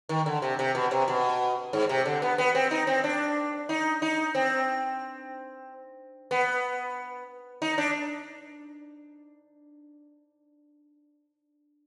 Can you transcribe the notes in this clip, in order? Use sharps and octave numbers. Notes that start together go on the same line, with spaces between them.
D#3
D3
C3
C3
B2
C3
B2
G#2
C3
D3
B3
B3
C4
D#4
C4
D4
D#4
D#4
C4
B3
D#4
D4